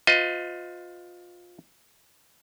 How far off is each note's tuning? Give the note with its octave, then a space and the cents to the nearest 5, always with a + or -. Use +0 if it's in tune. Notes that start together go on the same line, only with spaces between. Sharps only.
F4 +20 C5 -40 D#5 +20